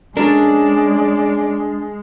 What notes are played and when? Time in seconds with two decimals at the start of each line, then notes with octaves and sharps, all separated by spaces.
0.17 G#3 C#4 D4 A4 A#4 D5